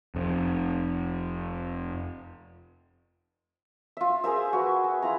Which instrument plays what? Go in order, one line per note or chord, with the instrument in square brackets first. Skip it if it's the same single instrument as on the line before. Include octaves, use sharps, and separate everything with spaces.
[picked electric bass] F1 F2
[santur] F4 E5
G#4 A#4 C5 E5
F#4 B4
G#4
E4 F4 A#5